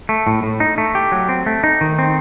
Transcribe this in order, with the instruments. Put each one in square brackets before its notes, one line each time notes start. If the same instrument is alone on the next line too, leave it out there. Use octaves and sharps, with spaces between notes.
[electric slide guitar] A3
A2
A2
D#4
A3
G4
F#3
C4
A3
D#4
D#3
C4